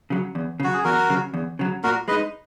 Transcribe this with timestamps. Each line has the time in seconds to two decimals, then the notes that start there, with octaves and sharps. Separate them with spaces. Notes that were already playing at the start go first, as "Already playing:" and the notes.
0.10 C#3 F#3
0.35 E2
0.60 C#3 F#3 F#4
0.74 G#4
0.84 E2 F#4 A#4
1.10 C#3 F#3
1.34 E2
1.59 C#3 F#3
1.84 A#2 F#4 A#4
2.08 G#3 B4 D#5
2.11 D#4